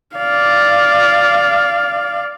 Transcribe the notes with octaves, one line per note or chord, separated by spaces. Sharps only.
D5 F5